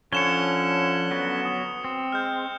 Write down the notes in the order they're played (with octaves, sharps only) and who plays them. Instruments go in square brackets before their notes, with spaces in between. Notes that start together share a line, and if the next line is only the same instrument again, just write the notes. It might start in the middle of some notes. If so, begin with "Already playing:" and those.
[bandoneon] D3 C#4 F#6 [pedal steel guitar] F3 C#5 [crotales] C#7 E7 G7
[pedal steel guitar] F#3 B3 F#4
[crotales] D#6
[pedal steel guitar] C4
[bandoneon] G#3 [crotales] F6 G6